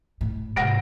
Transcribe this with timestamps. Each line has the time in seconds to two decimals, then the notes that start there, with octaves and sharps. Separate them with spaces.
0.21 A2
0.56 G#2 C3 F#5 A#6 D7